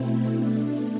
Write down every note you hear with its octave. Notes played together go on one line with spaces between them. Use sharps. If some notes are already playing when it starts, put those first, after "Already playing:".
Already playing: B2 A3 C4 E4
B2 A3 D4